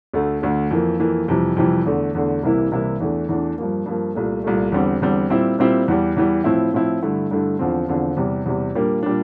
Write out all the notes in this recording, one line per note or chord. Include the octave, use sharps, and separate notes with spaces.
D2 D3 A3
D2 D3 A3
F2 E3 A#3
F2 E3 A#3
F2 C3 E3 G3
F2 C3 E3 G3
E2 D3 A3
E2 D3 A3
C2 C3 E3 A#3 E4
C2 C3 E3 A#3 E4
E2 E3 A3 D4
E2 E3 A3 D4
G2 F3 A#3
G2 F3 A#3
C2 A#2 A3
C2 A#2 A3
E2 D3 G3 C4
E2 D3 G3 C4
A#2 G3 C4 E4
A#2 G3 C4 E4
E2 E3 G3
E2 E3 G3
A2 F3 C4 E4
A2 F3 C4 E4
G2 D3 A3 E4
G2 D3 A3 E4
E2 D3 F3 C4
E2 D3 F3 C4
E2 C3 G3
E2 C3 G3
A#2 G3 A#3 D4
A#2 G3 A#3 D4